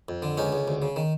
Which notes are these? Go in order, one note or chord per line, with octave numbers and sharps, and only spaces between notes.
F2
D3
C#2 C#4 D#4
C#2
D2
C#3
D#3